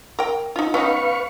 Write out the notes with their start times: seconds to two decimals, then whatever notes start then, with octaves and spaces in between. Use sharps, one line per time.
0.19 A#4 G5
0.56 D#4 F4
0.74 B3 C#4 D#4 B4 F5 C#6